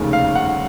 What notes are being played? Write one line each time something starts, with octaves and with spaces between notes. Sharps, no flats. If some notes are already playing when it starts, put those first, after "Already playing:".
Already playing: F1 D#2 C#3
F5
F#5